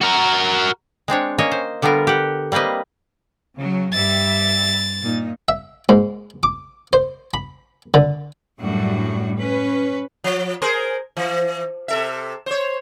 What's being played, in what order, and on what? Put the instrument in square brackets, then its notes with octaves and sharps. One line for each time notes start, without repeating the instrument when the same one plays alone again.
[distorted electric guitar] F#4 A#4
[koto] G#3 C4 D4 C#5
A#3 C#4 C#5 D#5
C5
D3 G3 B3 F4 A#4
G4 F#5
G3 A#3 C4 B4 D#5
[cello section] C#3 F#3
[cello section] G2 G3 E5 [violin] A6
[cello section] A#2 D#4
[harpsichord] E5
G#2
D6
C5
B5
D3
[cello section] F#2 A2 G3 D4 F#4
C#4 B4
[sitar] F3
G#4 A#4 C5
E3
C3 A4 E5
C5 C#5